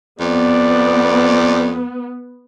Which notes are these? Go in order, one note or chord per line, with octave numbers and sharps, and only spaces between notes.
F2 B3 D5